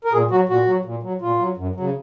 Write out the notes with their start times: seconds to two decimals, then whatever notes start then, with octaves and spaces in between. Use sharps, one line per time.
0.05 A#4
0.13 A#2 G#4
0.31 F#3 F#4
0.49 A#2 F#4
0.67 F#3
0.85 A#2
1.03 F#3
1.21 A#2 F4
1.39 F#3
1.57 F#2
1.75 C#3 F#3